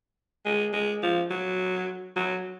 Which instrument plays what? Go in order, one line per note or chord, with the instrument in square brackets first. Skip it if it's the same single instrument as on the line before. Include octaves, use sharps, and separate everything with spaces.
[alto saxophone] G#3
G#3
F3
F#3
F#3